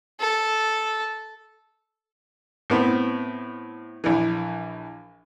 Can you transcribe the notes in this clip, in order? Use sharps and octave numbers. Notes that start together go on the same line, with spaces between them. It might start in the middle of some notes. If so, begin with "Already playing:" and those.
A4
A2 B3 C4
A#1 E3